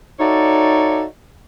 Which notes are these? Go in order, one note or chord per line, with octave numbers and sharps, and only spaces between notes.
D#4 F#4 A4 C#5 D5 E5